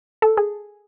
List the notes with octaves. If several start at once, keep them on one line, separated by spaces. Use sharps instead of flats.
A4
G#4